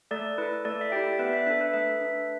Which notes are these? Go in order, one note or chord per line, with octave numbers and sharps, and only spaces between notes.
A3 A4 D5
E4 A4 B4
A3 A4 D5
E5
E4 G4 D5 G5
D5
B3 B4 E5
B4 E5
D4 A4 B4 E5
B4 E5
A3 B4 E5
D4 A4